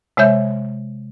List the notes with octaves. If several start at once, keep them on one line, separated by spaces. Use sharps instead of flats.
C3 G#3 C#5 E5 G6